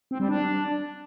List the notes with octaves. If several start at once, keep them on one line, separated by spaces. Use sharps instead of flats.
C4
G3
D4